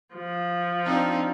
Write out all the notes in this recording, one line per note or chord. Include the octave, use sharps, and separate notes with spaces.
F3
C4 D4 D#4